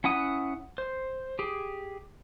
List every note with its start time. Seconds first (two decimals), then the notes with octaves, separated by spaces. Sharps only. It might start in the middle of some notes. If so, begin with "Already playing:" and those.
0.04 C#4 E4 F#5 D#6
0.78 C5
1.39 G4 G#4